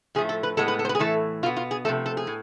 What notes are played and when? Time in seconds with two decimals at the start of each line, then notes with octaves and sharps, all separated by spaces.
0.15 A2 F3 A3 G#4
0.29 A4
0.43 B4
0.57 A2 G#3 B3 A4
0.68 B4
0.79 A4
0.85 C5
0.89 B4
0.95 G#4
0.99 A2 E3 A3 A4
1.43 B2 F4
1.46 B3
1.57 F4
1.71 G#4
1.85 C3 F3 A3 A4
2.06 A4
2.17 G#4
2.27 A2